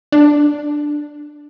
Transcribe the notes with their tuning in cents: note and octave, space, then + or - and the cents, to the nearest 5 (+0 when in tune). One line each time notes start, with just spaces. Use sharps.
D4 +10